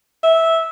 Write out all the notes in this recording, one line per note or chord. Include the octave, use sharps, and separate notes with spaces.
E5